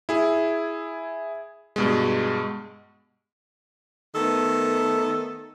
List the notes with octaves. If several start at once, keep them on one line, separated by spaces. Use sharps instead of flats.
E4 G#4
G2 B2 G#3
D#3 A3 B3 A4